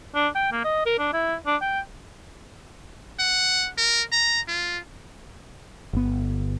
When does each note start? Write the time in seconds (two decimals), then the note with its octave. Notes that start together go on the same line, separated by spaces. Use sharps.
0.15 D4
0.35 G5
0.52 A#3
0.64 D#5
0.86 A#4
0.99 D4
1.13 E4
1.47 D4
1.62 G5
3.19 F#5
3.78 A#4
4.12 A#5
4.48 F4
5.93 G1 B3